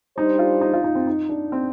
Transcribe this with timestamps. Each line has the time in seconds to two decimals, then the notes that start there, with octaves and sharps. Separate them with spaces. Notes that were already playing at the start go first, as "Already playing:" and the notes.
0.17 G3 D4 D#4 G4 C5
0.39 F4
0.61 D#4
0.74 F4
0.84 D#4
0.95 C4
1.07 D#4
1.29 D4
1.52 C4